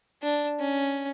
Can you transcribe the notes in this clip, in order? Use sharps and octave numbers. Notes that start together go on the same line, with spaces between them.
D4
C#4